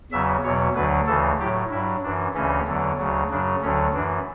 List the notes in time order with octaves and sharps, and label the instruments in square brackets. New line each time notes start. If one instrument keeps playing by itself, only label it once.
[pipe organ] E2 C#3 F#3 E5
E2 B2 F#3 C#5
D2 D3 F#3 B4
D2 C#3 E3 A4
A2 F#3 G4
G2 F#3 E4
F#2 E3 D4
D2 C#3 E3 C#4
E2 D3 F#3
D2 C#3 F#3
F#2 C#3 F#3 D4
D2 D3 F#3 C#4
F#2 E3 D4